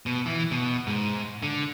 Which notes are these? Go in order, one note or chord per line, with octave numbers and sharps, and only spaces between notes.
B2
E3
B2
G#2
D3